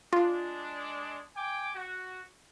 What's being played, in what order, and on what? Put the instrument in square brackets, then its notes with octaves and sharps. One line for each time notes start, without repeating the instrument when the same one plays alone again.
[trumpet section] G#3 D4 [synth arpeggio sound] F4
[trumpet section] G5 G#5 D6
F#4